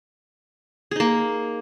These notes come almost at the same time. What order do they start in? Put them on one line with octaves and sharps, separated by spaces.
G#4 D#4 A#3